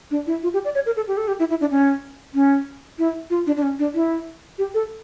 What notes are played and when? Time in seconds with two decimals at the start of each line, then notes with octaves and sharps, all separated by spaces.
0.11 D4
0.27 E4
0.43 F4
0.54 G4
0.65 D5
0.75 C#5
0.86 A#4
0.96 A4
1.08 G4
1.17 A4
1.28 G4
1.39 E4
1.50 E4
1.61 D4
1.71 C#4
2.34 C#4
2.99 E4
3.30 F4
3.47 D4
3.57 D4
3.63 C#4
3.79 D4
3.95 E4
4.58 G4
4.74 A4